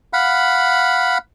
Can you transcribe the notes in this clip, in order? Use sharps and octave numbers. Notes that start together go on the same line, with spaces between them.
F5 F#5 B5